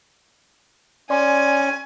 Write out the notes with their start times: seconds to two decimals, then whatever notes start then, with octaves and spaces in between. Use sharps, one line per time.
1.10 C#4 D5 G#5 C6